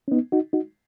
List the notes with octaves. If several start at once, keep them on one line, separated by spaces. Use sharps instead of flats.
C#4
B3 D#4
D#4 F#4
D#4 F#4